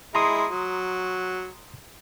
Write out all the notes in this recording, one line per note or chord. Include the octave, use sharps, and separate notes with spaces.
G#3 E4 A#5 C6 D#6
F#3